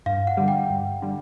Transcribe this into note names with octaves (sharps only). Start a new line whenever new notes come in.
G2 F5
F#5
D3 G3
G5
G2
D3 G3